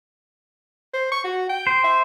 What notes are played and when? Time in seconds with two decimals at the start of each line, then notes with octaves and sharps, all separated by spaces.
0.93 C5
1.12 C#6
1.24 F#4
1.49 G5
1.67 C5
1.84 E5